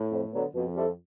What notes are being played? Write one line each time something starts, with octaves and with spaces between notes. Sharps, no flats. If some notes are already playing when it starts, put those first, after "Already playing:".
Already playing: A2
F2
D3 F#3 B3
F2 B2
G3 C4 E4 A4